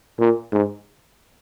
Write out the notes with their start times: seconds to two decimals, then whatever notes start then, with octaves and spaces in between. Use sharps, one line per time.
0.19 A#2
0.52 G#2